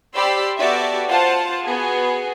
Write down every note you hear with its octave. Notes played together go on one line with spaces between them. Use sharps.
G4 C5 D5 B5 C6 E6
B3 F#4 G4 A4 D5 E5
F4 C5 F#5 A5
B3 F#4 G#4